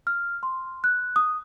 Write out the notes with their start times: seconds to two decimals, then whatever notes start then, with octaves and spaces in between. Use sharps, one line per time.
0.07 F6
0.43 C6
0.84 F#6
1.16 D#6